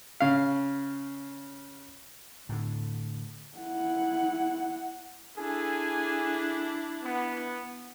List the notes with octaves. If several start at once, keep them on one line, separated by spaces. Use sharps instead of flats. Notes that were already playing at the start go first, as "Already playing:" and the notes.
C#3 F5
A2 D3
E4 F#5
D4 E4 G#4 A4 G#5
B3